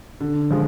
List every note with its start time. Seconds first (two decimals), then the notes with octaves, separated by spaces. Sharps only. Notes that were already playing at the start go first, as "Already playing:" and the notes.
0.21 D3
0.51 F3 G#3